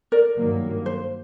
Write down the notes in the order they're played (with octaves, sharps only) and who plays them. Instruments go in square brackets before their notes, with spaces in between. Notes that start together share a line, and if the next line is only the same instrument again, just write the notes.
[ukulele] A#4 D5
[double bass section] G2 D#3 F#3 A#3
[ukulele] C5